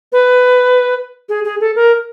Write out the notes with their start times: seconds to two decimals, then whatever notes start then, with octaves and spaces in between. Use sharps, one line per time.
0.12 B4
1.29 G#4
1.45 G#4
1.60 A4
1.76 A#4